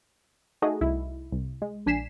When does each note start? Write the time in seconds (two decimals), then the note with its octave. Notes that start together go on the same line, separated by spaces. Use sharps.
0.62 A3 D#4 F#4 G#4 A4 D#5
0.81 C2 E4
1.32 C2
1.62 G#3
1.86 A#1 D4 G#5 B6 C7 E7